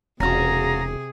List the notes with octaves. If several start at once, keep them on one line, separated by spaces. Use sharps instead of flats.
E1 C3 C#4 F4 F#4 G#4 A#5